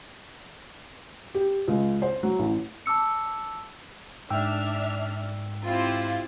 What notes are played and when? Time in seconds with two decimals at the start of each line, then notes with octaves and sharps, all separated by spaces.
1.35 G4
1.68 C#2
2.02 C5
2.23 F#3
2.39 A1
2.86 A5 D6 E6 C#7
4.30 G#2 D4 E5 G5 E6 F6
5.64 C4 E4 F4 G4